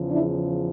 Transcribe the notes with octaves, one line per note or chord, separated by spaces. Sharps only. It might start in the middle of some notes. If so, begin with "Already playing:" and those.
Already playing: E2 C#3 F3
D4 E4